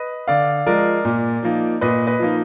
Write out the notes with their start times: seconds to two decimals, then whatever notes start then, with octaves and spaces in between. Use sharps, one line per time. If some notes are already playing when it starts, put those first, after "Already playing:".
Already playing: B4 D#5
0.28 D3 D5 F5
0.67 F3 G#3 A#4 D5
1.05 A#2
1.43 F3 A#3 D#4
1.81 A#2 B4 D#5
2.07 B4 D#5
2.20 F3 A#3 D#4